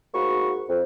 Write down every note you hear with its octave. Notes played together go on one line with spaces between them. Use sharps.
G#2 A#3 F#4 B5 C#6
F2